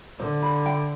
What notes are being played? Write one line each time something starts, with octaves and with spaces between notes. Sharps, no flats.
D3 C5
B5
G5